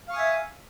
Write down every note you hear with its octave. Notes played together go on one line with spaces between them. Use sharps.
E5 F5 G#5 C#6 D#6